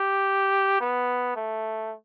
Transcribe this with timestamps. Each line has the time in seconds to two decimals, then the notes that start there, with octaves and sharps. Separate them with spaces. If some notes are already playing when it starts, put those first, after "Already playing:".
Already playing: G4
0.81 B3
1.36 A3